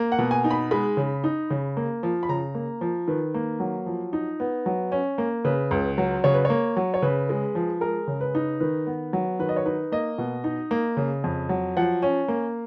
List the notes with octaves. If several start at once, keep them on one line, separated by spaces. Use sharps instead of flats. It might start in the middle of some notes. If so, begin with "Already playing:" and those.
Already playing: A#3
F#5
B2
G#5
D#4
B5
G#3 B5
C#3
D#4
C#3
A#3
F3
B5
C#3 A#5
A#3
F3
D#3 B4
A#3
F#3
F3
D#4
B3
F#3
C#4
A#3
C#3 B4
C#2
F#3
C#3 C#5
B4
A#3 C#5
F#3
C#5
C#3 B4
G#3
F3
G#3 A#4
C#3
B4
D#4
D#3 B4
B3
F#3
D#3 B4
D#5
C#5
D#4 B4
A#3 D#5
B2
D#4
A#3
C#3
F2
F#3
F3 F#5
C#4
A#3